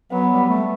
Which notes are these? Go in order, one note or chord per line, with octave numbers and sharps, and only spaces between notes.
F#3 B3
G3
A3